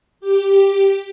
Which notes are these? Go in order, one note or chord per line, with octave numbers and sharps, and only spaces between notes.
G4